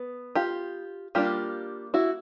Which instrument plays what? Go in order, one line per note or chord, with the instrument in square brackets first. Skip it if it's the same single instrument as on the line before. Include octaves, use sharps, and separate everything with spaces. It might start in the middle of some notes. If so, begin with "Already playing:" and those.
Already playing: [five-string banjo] B3
F4 G4
G3 A#3 D4 F4 G4
E4 F#4